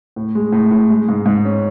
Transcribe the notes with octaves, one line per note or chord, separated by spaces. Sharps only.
A2
G#3
A2
A2
G#3
G#2
G#2
C#4